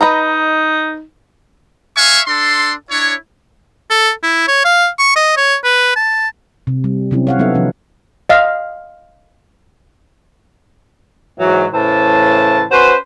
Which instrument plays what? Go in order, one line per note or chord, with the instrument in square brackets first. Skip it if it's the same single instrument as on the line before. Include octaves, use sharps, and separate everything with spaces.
[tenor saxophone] D#4 [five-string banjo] B4 D#5 A#5
[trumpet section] E5 F5 G#5 C#6
D4 A4 C6
D4 E4 C#5
[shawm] A4
E4
C#5
F5
C#6
D#5
C#5
B4
A5
[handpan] C3
G3
C3 F#3 C4 C#4 E4
C#5 F5 F#5
F#3 B3 D#4 A4 E5
C3 D#3 F3 C#4
[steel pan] D#5 F5
[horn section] G#2 E3 F#3
A2 C#3 E3 C5 A5
C#4 F#4 B4 C5